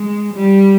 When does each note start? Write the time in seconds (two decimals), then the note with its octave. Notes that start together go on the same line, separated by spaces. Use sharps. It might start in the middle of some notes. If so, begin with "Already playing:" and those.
Already playing: G#3
0.33 G3